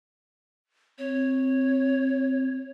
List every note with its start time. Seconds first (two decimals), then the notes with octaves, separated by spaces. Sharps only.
0.98 C4 C#5